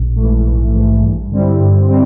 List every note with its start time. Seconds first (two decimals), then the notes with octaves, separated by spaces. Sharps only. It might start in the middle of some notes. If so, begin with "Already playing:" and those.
Already playing: A#1
0.16 G#2 E3 A3
0.45 A#1
0.73 G#2 E3 A3
1.03 G2
1.31 D3 G3 C4 E4
1.60 G2
1.89 D3 G3 C4